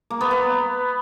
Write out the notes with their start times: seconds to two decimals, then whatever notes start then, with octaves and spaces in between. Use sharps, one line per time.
0.10 A#3
0.21 B3
0.31 B3